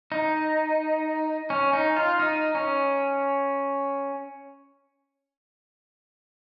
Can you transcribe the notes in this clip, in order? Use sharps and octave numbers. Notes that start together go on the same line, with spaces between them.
D#4
C#4
D#4
F4
D#4
C#4